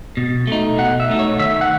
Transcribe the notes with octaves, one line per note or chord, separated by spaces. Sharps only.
B2
A3 D#4
B2 F#5
E5
A3 D#4
C#5
D#3 E5
F#5